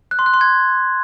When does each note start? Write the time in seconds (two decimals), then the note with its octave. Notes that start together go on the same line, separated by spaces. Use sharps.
0.11 F#6
0.19 C6
0.26 F#6
0.34 C6
0.41 G#6